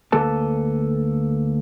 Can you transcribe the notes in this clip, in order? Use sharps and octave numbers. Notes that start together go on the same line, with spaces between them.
D2 A#3 A4 B4 A5